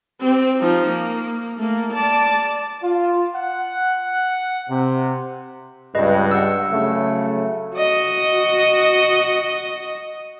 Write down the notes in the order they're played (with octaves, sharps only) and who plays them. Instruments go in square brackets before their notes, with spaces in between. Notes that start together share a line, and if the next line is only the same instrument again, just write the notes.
[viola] C4 G4
F3 D#4
A#3
A3 A#3
D5 A5
[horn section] F4
F#5
C3
[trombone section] C#2 G2 [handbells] B4 D#5
[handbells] F#5 E6
[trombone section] C#3 F#3 A3
[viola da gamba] F#4 D#5